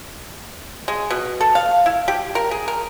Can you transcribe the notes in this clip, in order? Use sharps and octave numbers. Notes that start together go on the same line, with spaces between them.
G#3
B2
A4
F5
E4
G4
A#4
G#4
A#4